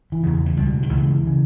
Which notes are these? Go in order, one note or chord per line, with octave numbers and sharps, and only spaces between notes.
E3
E2 C#3
E3
C#2 B2 G3
D#3
C#2 C#3 E3
C#3